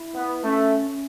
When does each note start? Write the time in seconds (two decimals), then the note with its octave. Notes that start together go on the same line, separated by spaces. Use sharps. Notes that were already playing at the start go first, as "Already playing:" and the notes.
Already playing: E4
0.14 B3
0.43 A3 C#4
0.89 C#4